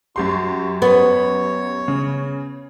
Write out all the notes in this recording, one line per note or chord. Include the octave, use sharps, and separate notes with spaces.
F#2 F#4 G4 C6
B3 C#5
C#3